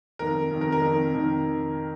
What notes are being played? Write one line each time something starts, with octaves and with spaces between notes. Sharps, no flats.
F2 D#3 A#4
F2 D#3
A#4
A#4
F2 D#3
F2 D#3